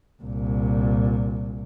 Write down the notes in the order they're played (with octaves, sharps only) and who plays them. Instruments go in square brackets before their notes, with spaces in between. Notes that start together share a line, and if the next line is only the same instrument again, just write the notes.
[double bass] C2 A#2